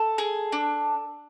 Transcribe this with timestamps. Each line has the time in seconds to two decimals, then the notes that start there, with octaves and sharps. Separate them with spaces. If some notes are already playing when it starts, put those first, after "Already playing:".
Already playing: A4
0.18 G#4
0.52 D4